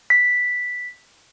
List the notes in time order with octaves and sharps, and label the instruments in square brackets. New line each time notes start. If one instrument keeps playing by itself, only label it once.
[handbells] B6